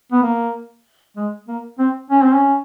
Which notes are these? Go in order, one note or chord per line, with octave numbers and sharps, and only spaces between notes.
B3
A#3
G#3
A#3
C4
C#4
C4
C#4